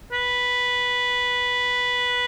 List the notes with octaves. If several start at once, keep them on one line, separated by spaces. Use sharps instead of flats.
B4